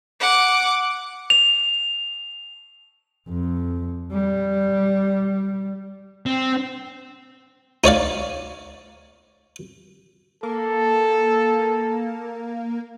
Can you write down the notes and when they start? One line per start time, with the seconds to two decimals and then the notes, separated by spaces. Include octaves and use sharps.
0.20 F#5 D6
1.30 F7
3.29 F2
4.12 G3
6.26 C4
7.84 D#4 C#5 D5 F5
10.43 A#3 A4